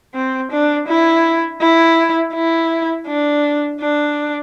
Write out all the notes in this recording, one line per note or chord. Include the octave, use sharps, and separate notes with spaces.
C4
D4
E4
E4
E4
D4
D4